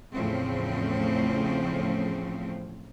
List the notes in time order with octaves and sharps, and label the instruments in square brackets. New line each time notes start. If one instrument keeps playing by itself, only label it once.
[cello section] E2 A2 C#3 F3 C4